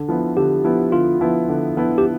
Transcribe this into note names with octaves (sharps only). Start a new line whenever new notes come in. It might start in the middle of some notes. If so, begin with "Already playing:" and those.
Already playing: D3
F3 B3 E4
D3 G4
F3 B3 E4
D3 F4
F3 B3 E4
D3
F3 B3 E4
G4